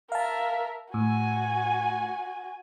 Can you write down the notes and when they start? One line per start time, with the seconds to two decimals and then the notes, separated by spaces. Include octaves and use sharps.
0.12 A#4 E5 F5 A5
0.94 A2 F#4 G#5